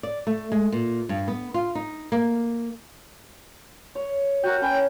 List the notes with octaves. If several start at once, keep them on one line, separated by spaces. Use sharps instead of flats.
D5
A3
G#3
A#2
G2
B3
F4
D#4
A#3
C#5
F#4 A#4 G5
C#4 B4 G5 G#5